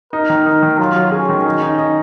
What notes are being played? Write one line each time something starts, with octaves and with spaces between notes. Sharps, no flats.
D#4 A#4
D#3
D#4
D#3
F#3 F4
F#3
C#4 G#4
D#3
D#4
D#4
D#4